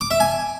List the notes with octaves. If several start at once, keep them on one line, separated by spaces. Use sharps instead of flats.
D6
E5
G#5